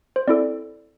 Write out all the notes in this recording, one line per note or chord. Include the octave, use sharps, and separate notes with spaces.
C5
C4 E4 A4 D5